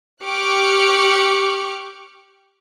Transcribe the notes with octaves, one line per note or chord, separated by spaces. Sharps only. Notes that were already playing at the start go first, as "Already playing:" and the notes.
G4 C#6 D6 F6 F#6 C#7